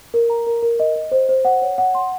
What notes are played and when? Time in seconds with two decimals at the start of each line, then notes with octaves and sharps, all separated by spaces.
0.14 A#4
0.30 A#5
0.47 A#4
0.62 A#4
0.80 D#5
0.96 D#5
1.12 C5
1.29 C5
1.45 F#5
1.62 C#5
1.78 F#5
1.95 C6